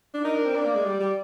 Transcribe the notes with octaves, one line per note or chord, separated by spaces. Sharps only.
D4
D#4 A#4
D4
C4
D4 D5
A#3
G#3
G3
G3